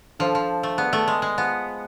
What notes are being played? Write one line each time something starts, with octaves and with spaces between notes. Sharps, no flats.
F3 D4 A4 C5 F5 A5
F3
A3
B3 G#4 B4 D5
A3
G#3
G#3
B3 F4 G#4 C5 F5 A5